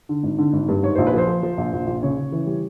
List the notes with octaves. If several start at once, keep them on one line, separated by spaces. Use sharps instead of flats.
D3
G#1
D3
G#1
G2
G#2 C#5
A#1 C5
B4
F3 C5
F3
F3
A#1
A#1
A#1
C#3 C#5
C#3
E3
G3